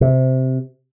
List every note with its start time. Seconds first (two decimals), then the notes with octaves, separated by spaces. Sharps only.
0.01 C3